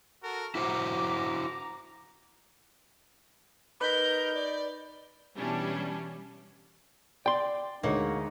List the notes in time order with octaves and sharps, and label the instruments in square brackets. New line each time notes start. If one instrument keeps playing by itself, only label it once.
[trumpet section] F#4 A4 A#4
[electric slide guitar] E4 F#4 C5 [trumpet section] A#5 [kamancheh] D6
[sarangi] D#4 [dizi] A#4 [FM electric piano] B4 B5 [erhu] G6
[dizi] D5
[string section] B2 E3 G3 C#4 D4 E4
[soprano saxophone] D5 [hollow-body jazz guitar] G5 C6
[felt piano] D2 G#3 [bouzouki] A#3 C#5 F#5 [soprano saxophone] D#4